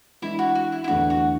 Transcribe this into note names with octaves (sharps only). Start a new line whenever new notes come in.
E3 G#3 D4 E4
F#4
F#4
E4
E4
E2 D3 A3 D4 F#4
F#4